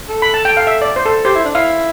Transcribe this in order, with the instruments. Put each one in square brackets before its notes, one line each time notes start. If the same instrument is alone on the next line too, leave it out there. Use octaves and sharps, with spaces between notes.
[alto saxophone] A4
[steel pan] B5
A5
G5
F5
E5
D5
C5
A4
[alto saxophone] G4 [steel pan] C5
[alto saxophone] E4
D4
[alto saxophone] E4 [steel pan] F5